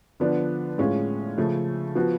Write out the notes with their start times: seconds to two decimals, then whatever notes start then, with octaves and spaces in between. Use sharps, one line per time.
0.20 D3 F3 B3 D4
0.78 A2 G#3 C#4 F4
1.38 C#3 F3 A3
1.95 F3 B3 F#4